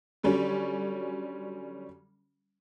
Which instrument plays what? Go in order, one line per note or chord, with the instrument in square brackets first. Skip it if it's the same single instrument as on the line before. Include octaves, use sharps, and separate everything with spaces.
[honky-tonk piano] D3 F#3 G3 C#4